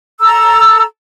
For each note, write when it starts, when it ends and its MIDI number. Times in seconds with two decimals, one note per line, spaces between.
0.21 0.83 69
0.21 0.83 82
0.21 0.83 88